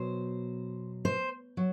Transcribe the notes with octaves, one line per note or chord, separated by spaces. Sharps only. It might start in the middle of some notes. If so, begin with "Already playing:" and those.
Already playing: B2 F#3 C5
C5
F#3